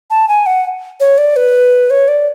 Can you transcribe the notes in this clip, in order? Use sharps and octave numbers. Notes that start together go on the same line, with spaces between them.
A5
G#5
F#5
C#5
D5
B4
C#5
D5